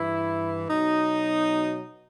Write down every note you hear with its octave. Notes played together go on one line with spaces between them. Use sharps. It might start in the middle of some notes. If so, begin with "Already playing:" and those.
Already playing: G2 E3 E4
B2 F#3 D#4